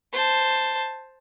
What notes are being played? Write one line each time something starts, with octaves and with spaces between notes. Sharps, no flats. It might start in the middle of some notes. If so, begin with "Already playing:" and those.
C5 A5